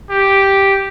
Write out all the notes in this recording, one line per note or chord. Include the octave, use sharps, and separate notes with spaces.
G4